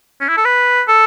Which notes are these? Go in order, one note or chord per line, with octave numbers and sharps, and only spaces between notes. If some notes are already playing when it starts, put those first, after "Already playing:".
C#4
E4
A4
B4
A4